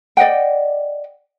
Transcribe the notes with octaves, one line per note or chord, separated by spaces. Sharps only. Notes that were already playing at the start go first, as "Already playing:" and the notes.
D5 D#5 F#5 G5